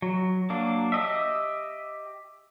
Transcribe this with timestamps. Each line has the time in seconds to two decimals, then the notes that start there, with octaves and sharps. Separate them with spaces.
0.02 F#3
0.50 F#3 A#3 D4
0.92 G4 D#5 E5